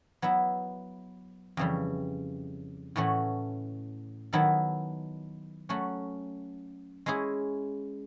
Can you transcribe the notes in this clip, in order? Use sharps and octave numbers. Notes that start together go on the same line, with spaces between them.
F#3 B3 E4
F2 C#3 E3 G3
A2 E3 A3 C#4 F#4
D#3 F#3 B3 E4 A4
F#3 A3 C#4 F#4
G#3 C#4 E4 G#4